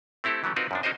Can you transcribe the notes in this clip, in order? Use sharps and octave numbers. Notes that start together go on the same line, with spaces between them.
A3 C4 E4 G4 A4
E3 F#3 A3 C#4
C4 D#4 F4 F#4 A#4 B4
F#2 F3 D4
C#4 D#4 F#4 A#4 C5 D#5